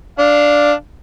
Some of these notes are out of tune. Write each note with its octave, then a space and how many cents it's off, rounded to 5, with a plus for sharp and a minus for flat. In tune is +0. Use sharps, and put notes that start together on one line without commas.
D4 +0 F5 +0